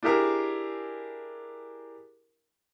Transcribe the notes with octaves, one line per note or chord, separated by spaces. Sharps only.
D4 E4 G4 G#4 A#4